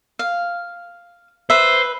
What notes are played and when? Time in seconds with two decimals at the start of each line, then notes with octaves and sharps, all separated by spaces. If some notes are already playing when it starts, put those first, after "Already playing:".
0.19 F5
1.50 B4 C5 E5